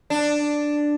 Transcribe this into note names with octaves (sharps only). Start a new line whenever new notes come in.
D4